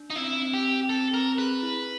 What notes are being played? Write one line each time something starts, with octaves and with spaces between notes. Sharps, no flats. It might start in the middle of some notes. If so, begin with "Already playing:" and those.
Already playing: D4
D#4
C4 E4
C4
G4
C4
C4 A4
C4 A#4
G#4 B4
E4